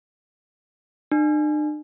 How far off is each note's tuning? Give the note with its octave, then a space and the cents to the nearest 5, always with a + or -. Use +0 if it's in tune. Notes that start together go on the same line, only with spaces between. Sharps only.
D4 +45